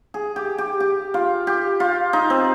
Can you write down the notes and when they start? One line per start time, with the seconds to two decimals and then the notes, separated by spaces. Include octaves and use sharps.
0.14 G#4
0.36 G4
0.58 G4
0.80 G4
1.14 F4
1.47 G4
1.80 F4
2.13 D#4
2.30 C4